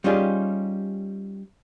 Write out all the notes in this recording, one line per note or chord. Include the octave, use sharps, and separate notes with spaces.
G3 C#4 D#4 F4 G4 G#4